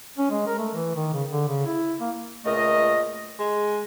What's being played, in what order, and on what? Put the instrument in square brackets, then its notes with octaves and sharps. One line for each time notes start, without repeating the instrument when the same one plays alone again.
[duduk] C#4
G#3
A#4
A3
E3
D#3
C#3
D3
C#3
E4
A#3
[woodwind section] C#2 A#2 A3 A#4 D#5
[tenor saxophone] G#3